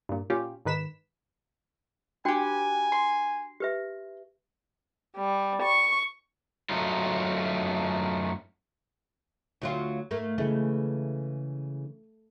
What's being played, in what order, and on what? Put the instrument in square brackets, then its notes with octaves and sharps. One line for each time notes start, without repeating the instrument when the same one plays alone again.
[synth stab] G2 A#2
A#2 C#4 F4 G4
G#2 D#3 B4 B6 E7
[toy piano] D4 F#4 G5 [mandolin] G4 B4 [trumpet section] G#5
[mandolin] C6
[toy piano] G4 B4 E5
[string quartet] G3
C#6
[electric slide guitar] F#2 F#3 A3 D#4 F4
[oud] D2 F#3 F4
[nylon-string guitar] G#2 [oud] A3 A#3
[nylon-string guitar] C#3 E3 G#3 [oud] A3